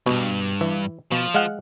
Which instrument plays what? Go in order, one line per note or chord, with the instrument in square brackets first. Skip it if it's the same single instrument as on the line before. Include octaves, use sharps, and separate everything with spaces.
[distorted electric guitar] B1 G2 [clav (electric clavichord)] B2
[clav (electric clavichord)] E3
[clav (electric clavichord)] B2 [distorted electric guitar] F3
[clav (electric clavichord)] G#3 F5 F#5